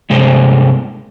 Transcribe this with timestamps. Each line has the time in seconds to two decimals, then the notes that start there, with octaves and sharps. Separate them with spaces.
0.10 G2 C3 G#3 C5